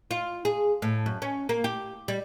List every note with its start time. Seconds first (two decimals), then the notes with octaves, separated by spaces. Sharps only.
0.11 F4
0.45 G#4
0.82 A2
1.06 F#2
1.22 C#4
1.49 A#3
1.64 G4
2.08 G3